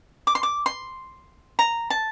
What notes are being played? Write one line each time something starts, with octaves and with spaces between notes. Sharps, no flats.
D6
C6
D6
C6
A#5
A5